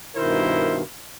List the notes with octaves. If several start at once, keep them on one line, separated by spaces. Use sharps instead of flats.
G2 B2 D#3 E4 A#4 C5